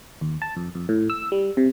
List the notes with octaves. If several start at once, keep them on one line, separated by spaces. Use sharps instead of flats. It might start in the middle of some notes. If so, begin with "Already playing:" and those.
D#2
A5
F2
F2
A2
E6
G3
C3